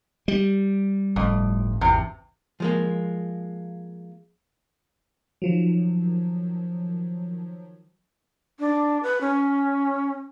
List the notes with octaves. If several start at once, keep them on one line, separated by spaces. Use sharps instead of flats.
G3
G1 F2 A2
G#1 E2 C3
F3 G#3 A#3
D#3 F3 F#3
D4
B4
C#4